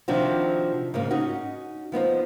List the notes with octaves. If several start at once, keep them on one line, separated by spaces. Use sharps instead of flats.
C3 D#3 F3 C4 D4 F#4
G#2 C#3 A#3
C#4 D#4 F#4
F3 B3 D#4 C5